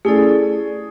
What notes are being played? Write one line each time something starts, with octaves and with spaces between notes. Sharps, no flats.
A3 C#4 E4 G#4 A4 D5